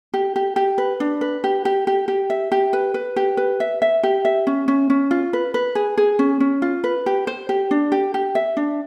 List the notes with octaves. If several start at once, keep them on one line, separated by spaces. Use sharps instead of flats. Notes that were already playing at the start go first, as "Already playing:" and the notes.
G4
G4
G4
B4
D4
B4
G4
G4
G4
G4
E5
G4
B4
B4
G4
B4
E5
E5
G4
E5
C#4
C#4
C#4
F4
B4
B4
G#4
G#4
C#4
C#4
F4
B4
G4
C5
G4
D4
G4
G4
E5
D4